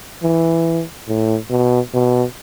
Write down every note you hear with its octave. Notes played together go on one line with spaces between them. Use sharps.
E3
A2
B2
B2